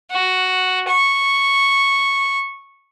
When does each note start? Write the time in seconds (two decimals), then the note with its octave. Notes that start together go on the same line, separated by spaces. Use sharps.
0.11 F#4
0.88 C#6